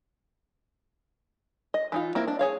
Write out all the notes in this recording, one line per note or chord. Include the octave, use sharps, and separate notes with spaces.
D#5
E3 D#4 F4
A#3 C4 E4
D4 D5
G#4 C#5 F5